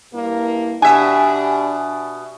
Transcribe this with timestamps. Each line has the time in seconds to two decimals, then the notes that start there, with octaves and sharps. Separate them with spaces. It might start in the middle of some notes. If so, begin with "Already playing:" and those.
0.14 G2 A#3 E4
0.82 B2 D4 G4 E5 G#5